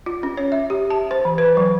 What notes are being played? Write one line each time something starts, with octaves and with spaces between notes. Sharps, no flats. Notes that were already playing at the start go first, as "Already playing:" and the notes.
F4
C#4
C#5
E5
G4
A5
C5
E3
B4
F#3